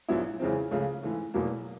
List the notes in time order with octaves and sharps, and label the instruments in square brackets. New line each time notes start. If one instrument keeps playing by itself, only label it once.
[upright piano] A#1 A#2 F#3 B3 E4
E2 C#3 E3 G#3 C4
C#2 C#3 F3 A3
G#2 E3 A3
F1 E2 B2 F#3 A#3